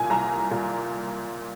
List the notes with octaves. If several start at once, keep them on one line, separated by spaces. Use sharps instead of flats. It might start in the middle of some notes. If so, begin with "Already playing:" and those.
Already playing: C2 A#2 G#5
C2 A#5
A#2